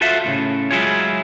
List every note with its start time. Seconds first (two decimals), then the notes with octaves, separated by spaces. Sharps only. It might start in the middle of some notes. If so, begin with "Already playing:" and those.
0.01 F4 F#4 A4 C5 E5 F5
0.25 D#2 A2 C#3
0.71 F#3 G#3 E4 F4 G#4 C#5